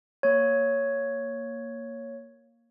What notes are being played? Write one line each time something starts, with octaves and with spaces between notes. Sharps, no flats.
A#3 C#5